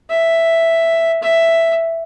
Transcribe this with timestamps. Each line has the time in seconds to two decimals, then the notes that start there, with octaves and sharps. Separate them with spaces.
0.10 E5
1.23 E5